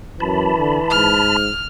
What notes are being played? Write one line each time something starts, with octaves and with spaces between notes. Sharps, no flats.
F#2 E3 A5 B5
D3
G#2 F6